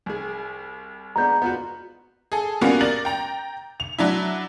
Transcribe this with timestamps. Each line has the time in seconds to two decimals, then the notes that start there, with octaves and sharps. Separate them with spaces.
0.06 C2 G#4
1.16 G#3 B3 D4 A#5 G6
1.42 B3 F4 F#4
2.32 G#4 A4
2.61 G3 A#3 B3 C#4 F4 F#4
2.81 A#4 D5 A6 F#7
3.05 G5 A#5
3.80 F7
3.98 F#3 D4 E4